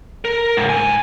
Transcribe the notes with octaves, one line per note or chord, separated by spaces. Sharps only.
A#4
C#2 G#2
G#2 G#5